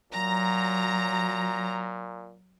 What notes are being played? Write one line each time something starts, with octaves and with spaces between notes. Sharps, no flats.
A#2 F#3 A#5